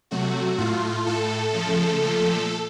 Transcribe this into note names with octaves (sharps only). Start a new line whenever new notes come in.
C3 F#3 A3 F#4
A2 A3 F4
A2 A3 A4
C#3 F3 A3
A#2 F3 A3